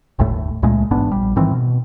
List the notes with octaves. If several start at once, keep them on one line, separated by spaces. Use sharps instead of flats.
G1 D#2 A2 A3
C#2 A#2 G#3 A3
A1 G#2 B3 D4
A#1 G3
G#2 D#3 E3 C4
B2